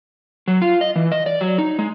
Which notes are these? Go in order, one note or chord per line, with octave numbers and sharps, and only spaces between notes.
F#3
F4
D#5
E3
D#5
D5
F#3
D#4
G#3